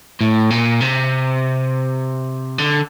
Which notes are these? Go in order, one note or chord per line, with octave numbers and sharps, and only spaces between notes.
A2
A#2
C3
D3